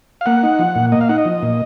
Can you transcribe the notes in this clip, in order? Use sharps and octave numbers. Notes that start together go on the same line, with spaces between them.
F5
A#3 F#5
D#4
F3
A#2
A#3 D#5
F5
D#4 F#5
D#5
F3
A#2